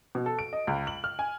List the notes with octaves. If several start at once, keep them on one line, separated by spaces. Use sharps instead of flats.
B2
A4
D7
D#5
C#2
F#7
F6
G#5